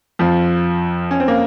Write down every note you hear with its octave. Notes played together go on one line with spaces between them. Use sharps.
F2 F3
C#4
C4
A#3